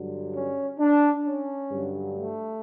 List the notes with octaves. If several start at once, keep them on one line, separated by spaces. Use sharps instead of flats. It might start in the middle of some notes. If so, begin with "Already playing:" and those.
Already playing: G2 D3 F#3
C#4
D4
C#4
G2 D3 F#3
A3